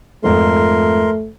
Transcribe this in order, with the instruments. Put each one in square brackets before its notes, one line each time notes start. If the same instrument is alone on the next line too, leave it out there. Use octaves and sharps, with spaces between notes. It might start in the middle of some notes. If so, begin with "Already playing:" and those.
[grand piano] F2 G#2 F3 [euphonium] A3 [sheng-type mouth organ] A#4 C6